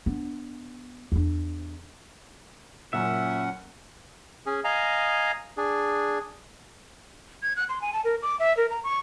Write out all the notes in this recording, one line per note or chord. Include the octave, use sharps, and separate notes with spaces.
B3 D4
E2 D4
F#1 F#2 A#2 F#3 C#4 E5 F#5
C#4 G#4
D#5 F5 G#5 A#5
D4 G#4
G#6
F#6
C6
G#5
A5
A#4
D6
E5
A#4
A#5
C#6